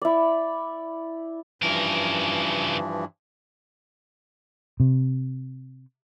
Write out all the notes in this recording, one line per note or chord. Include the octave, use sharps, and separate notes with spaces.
E4 D5
G2 C#3 E3 F3 A#4
C3